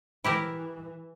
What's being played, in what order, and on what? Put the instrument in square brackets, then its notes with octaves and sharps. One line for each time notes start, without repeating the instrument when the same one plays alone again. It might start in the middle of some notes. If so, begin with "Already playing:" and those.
[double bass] E3 [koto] E4 G4 A#4